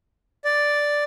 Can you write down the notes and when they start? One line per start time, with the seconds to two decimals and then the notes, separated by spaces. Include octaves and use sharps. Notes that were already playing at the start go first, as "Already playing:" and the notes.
0.44 D5